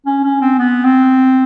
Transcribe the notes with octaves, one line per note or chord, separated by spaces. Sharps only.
C#4
C#4
C4
B3
C4